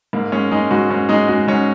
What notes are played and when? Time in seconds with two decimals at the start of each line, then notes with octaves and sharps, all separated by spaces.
0.13 G#2 A#3
0.32 G#3 C#4
0.51 G#3 D#4
0.71 G#2 F#4
0.90 G#2 C#4
1.09 G#3 D#4
1.28 G#3 F#4
1.48 G#2 C#4